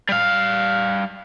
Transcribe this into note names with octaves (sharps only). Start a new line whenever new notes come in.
G3 F5